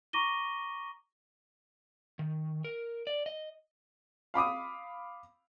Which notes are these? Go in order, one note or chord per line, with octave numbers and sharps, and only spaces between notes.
A#5 C#6 D6 A#6 D#7 G7
D#3
A#4
D5
D#5
F5 B5 D6 D#6